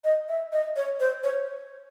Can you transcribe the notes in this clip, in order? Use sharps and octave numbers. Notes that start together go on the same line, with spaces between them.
D#5
E5
D#5
C#5
C5
C#5